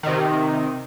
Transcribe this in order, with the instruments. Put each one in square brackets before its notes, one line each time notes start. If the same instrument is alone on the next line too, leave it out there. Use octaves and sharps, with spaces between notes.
[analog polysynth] C3 D#3